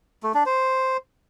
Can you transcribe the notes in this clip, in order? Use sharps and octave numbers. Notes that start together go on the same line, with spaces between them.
A3
D4
C5